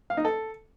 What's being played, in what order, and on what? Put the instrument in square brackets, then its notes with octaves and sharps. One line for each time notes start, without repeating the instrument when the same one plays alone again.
[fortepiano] F5
D#4
A4